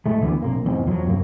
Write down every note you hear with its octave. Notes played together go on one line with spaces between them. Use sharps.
A2 G#3 A3
D2 E3 A3 B3
A#1 C3 A#3
F1 E2 G#2 C4
E2 F3 F#3
F#2 C3 A3 A#3